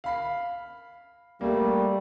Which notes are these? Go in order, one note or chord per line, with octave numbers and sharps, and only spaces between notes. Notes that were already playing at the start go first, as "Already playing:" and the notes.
F5 B5 C7
G3 A3 A#3